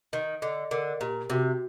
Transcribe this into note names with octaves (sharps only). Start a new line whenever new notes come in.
D#3 D#5
D3 D#5
D3 A#4
A#2 G4
C3 F#4